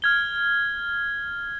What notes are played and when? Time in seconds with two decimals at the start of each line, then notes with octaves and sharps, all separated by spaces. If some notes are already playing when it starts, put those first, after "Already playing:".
0.02 F6 G#6 G7